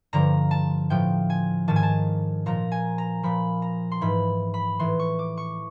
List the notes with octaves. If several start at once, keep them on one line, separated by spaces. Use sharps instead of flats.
G2 D3 F3 A#5
A5
A2 F3 G5
G#5
G#2 D#3 A5
G#5
A5
A#2 F3 A#5
G#5
A#5
A#2 F3 B5
A#5
C6
G#2 E3 B5
B5
A2 E3 C6
C#6
D6
C#6